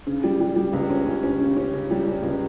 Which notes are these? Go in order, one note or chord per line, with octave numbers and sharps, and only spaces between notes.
C#3
G3
G3
G3
C#2
C#4
C#4
C#4
C#3
C#4
C#3
G3
C#4
C#2